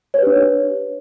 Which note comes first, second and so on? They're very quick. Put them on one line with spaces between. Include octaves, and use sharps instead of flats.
C#5 B4 G4 D4